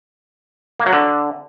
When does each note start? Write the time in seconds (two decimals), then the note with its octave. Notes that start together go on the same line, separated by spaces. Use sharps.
0.80 A#3
0.86 F#3
0.93 D3